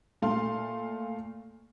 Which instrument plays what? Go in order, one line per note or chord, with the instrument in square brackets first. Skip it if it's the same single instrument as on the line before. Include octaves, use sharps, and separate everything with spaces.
[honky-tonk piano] A#2 A3 F5 C6